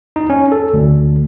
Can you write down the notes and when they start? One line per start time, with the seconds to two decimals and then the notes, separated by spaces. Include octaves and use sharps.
0.16 D#4
0.30 C#4
0.52 A4
0.73 D2